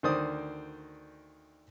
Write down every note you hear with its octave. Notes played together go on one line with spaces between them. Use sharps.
D2 D#3 C5 D5 D#6